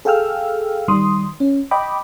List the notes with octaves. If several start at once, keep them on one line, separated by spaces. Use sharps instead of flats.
G#4 A4 F5 G5 E6 F6
D#3 G3 C6 D#6
C#4
D#5 G5 B5 D6